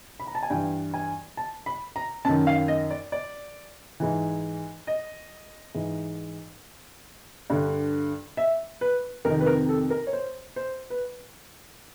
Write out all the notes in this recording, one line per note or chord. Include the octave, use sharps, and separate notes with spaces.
B5
A#5
A5
G#5
G2 E3 G5
G#5
A5
B5
A#5
F#2 D#3 A5
F5
D#5
D5
D5
G#2 E3
D#5
G#2 E3
G2 D3
E5
B4
F2 C3 D#3 A#4
B4
A#4
A4
A#4
C#5
C5
C5
B4